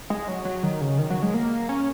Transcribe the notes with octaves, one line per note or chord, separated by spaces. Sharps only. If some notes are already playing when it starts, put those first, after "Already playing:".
G#3
F#3
F#3
D#3
C#3
D#3
F#3
G#3
A#3
C#4